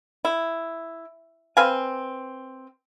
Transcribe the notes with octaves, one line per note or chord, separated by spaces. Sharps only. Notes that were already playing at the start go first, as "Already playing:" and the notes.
E4
C4 B4 F5 G#5